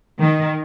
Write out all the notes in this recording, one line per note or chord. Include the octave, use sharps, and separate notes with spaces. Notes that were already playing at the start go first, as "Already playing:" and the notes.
D#3